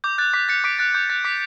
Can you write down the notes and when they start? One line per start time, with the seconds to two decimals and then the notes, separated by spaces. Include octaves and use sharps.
0.04 D6 G6
0.18 F#6 A6
0.34 D6 B6
0.49 F#6 A6 C#7
0.64 D6 B6 D7
0.79 F#6 A6
0.94 D6 G6
1.09 F#6 A6
1.25 D6 B6